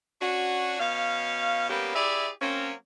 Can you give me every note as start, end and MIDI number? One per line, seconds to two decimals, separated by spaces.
0.21 0.79 61
0.21 0.79 62
0.21 0.79 66
0.80 1.67 47
0.80 1.67 61
0.80 1.67 77
1.70 1.93 55
1.70 1.93 58
1.70 1.93 59
1.70 1.93 61
1.70 1.93 67
1.95 2.29 64
1.95 2.29 67
1.95 2.29 68
1.95 2.29 74
1.95 2.29 76
2.41 2.72 54
2.41 2.72 58
2.41 2.72 60
2.41 2.72 61